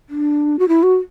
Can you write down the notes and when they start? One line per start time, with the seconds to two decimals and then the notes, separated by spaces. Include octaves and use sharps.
0.09 D4
0.59 F#4
0.68 E4
0.83 F#4